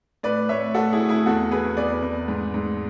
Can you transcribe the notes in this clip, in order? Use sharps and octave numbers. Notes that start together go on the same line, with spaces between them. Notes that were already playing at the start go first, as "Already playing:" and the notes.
A2 B4 D5
A2 C#5 E5
A2 F#4 A4
E4 G#4
A2
E4 G#4
E2 F#4 A4
E2 G#4 B4
E2 B4 D5
E2
G#2
G#2